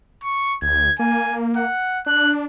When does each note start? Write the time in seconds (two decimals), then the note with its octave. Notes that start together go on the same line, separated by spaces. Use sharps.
0.23 C#6
0.62 D2 G#6
0.99 A#3 G#5
1.57 F#5
2.06 D4 F#6